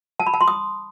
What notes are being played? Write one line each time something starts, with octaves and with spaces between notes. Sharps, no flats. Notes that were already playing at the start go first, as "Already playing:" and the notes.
A5
B5
A5
C6
D#6